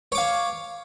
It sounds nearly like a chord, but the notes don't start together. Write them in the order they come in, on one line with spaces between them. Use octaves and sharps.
C#5 D6 F5